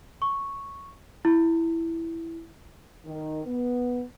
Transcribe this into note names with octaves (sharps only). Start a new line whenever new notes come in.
C#6
E4
D#3
B3